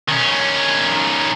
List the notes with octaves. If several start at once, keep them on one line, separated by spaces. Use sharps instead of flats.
D#3 C#4